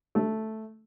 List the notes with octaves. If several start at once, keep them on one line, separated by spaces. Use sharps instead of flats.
A3